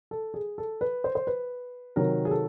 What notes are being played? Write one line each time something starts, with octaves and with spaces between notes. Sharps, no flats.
A4
G#4
A4
B4
C5
C5
B4
C3 D#3 F#3 A#4
G#4
A4